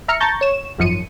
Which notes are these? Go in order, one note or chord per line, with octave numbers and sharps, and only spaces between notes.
E5 A#5 F6 C#7
A5 A#5 C#6 G6 A6
C#5 E7
G#1 F#2 F3 C#7 D#7